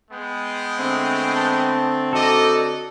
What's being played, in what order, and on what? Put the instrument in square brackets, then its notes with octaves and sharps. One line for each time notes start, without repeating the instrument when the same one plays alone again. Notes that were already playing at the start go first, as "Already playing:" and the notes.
[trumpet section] G#3 B3 G5
[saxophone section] D3 A3 C4
[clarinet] A5
[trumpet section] D#4 D5 D#5 [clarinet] F#4 [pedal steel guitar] A4